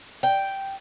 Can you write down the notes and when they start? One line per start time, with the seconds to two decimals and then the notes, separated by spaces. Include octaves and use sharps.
0.23 G5